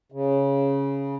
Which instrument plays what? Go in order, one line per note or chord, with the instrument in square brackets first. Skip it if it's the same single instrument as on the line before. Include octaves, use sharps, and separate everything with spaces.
[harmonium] C#3